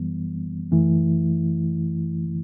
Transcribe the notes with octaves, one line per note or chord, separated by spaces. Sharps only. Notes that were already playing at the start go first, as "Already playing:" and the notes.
Already playing: F#2 E3 G3 B3
F#2 E3 A3 E4